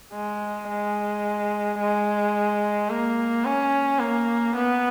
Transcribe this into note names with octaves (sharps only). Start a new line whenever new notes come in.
G#3
G#3
G#3
A#3
C#4
A#3
B3